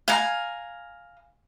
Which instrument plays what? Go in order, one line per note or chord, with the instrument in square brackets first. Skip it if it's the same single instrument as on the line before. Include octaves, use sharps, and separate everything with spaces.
[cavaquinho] F5 G#5 A#5